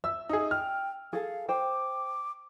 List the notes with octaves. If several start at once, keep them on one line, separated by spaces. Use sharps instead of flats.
E5 E6
D#4 G#4 D#6
G5 F6
G#4 A4 F5
C5 G5 D6